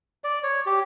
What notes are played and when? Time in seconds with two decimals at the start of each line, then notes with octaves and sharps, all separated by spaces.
0.24 D5
0.43 C#5
0.66 G4